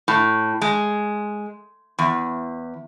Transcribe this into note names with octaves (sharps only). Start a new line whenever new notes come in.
A2
G#3
E2